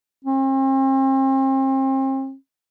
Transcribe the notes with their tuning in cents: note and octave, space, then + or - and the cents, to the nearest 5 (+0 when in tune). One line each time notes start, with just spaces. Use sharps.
C4 +40